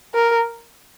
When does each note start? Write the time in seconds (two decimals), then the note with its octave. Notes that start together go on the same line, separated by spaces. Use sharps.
0.15 A#4